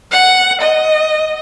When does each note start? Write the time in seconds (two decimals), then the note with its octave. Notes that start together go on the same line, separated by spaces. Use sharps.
0.11 F#5
0.61 D#5